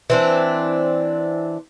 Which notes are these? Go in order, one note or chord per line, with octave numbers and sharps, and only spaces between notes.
E3 C4 D4